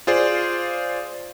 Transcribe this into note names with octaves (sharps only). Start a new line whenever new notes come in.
F4 G#4 C5 D5